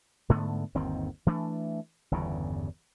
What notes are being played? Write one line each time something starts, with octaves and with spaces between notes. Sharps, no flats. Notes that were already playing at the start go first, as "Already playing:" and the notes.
G#2 D3 A3 B3
G1 D#2 D#3 C4
E3 A3 D4
G1 E2 G2 C#3